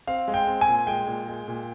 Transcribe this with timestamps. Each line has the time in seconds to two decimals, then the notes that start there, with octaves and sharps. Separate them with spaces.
0.07 C4 F5
0.28 G#3
0.34 G5
0.47 C4
0.61 G#5
0.68 A#2
0.87 G#3 G5
1.07 A#2
1.28 G#3
1.48 A#2